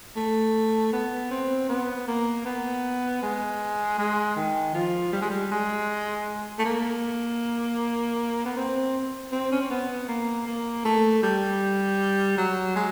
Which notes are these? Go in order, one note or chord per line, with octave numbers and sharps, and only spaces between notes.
A3
B3
C4
B3
A#3
B3
G#3
G#3
D#3
F3
G3
G#3
G3
G#3
A3
A#3
B3
C4
C4
C#4
C4
B3
A#3
A#3
A3
G3
F#3
G#3